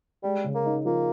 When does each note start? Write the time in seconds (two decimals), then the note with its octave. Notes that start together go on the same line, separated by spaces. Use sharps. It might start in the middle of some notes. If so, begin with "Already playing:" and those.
0.23 G3 G#3
0.44 C#3
0.55 A#3
0.65 D#4
0.85 F3 A#3